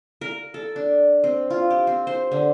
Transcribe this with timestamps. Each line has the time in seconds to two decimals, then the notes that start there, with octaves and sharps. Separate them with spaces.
0.21 A#4
0.54 A4
0.76 D4
1.24 C4
1.50 F4
1.70 G4
1.87 C4
2.07 C5
2.32 D3